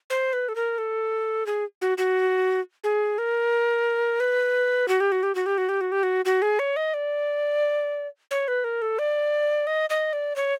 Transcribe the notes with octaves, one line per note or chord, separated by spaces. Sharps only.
C5
B4
A4
A#4
A4
G#4
F#4
F#4
G#4
A#4
B4
F#4
G4
F#4
G4
F#4
G4
F#4
G4
F#4
G4
F#4
F#4
G#4
C#5
D#5
D5
C#5
B4
A#4
A4
D5
D#5
D#5
D5
C#5